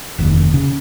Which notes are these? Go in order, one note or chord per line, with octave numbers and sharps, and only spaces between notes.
F1 D#2
C#3